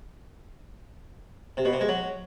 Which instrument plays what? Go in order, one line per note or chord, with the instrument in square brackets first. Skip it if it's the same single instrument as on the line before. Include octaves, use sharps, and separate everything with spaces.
[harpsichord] C3
B2
C3
G#3
F#3